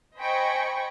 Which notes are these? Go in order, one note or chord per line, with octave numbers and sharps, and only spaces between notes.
C5 D#5 G5 G#5 B5 C#6